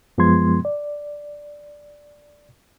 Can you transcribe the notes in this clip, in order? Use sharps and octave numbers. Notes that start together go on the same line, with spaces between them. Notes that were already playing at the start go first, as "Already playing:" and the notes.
F#2 F3 G#3 B3 C6 G#6
D5